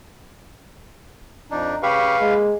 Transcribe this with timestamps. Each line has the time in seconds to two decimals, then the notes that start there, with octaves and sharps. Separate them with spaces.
1.51 F2 D4 D#4
1.83 C#3 G4 B4 F5 C#6
2.20 G#3 A#3